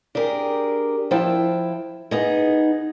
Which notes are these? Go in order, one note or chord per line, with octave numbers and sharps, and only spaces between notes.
D4 G4 G#4 A#4
F3 E4 G5 A5
B3 D#4 G#4